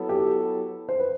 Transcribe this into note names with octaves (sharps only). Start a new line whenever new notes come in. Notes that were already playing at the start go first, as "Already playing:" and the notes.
Already playing: F#3 B3 E4 A4
G4
C5
B4